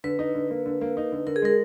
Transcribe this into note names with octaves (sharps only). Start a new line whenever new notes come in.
D3 B4
D#4
D3
A#3
D3
A#3
D#4
D3
D3 A#4
G#4
G#3 A#4